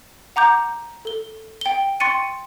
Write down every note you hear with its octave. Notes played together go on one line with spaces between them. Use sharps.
F#5 A#5 D6 G6
A4 G7
G5 G7
G5 C6 C#6 A6 C#7 D#7